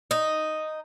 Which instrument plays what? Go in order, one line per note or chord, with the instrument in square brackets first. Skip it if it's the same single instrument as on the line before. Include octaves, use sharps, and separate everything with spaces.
[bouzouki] D#4